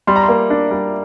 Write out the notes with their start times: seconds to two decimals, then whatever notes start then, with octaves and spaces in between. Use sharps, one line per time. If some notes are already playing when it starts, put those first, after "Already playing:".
0.07 G3 C6
0.16 A#5
0.23 C6
0.29 A#3
0.50 D4
0.71 G3